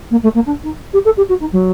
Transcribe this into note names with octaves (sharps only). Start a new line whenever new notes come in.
A#3
A3
A#3
D4
D#4
G4
A4
G4
F#4
D#4
F#3